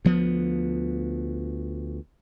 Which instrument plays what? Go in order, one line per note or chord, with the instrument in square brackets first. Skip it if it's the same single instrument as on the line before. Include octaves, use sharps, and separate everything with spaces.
[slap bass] D2 F3 B3